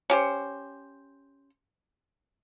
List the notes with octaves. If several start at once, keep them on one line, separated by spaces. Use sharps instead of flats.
C#4 G4 C5